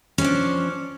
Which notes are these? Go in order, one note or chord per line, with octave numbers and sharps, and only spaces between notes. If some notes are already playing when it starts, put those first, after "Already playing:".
F3 C#4 D4